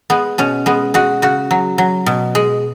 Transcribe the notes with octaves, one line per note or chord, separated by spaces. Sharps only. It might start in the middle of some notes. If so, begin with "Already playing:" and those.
G#3 B3
B2 C#4
G#3 B3
G#3 F#4
C#3 F#4
F#3
F#3
B2
G#3